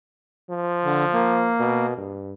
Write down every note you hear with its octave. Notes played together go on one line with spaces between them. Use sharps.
F3
D3
A#3
B2
G2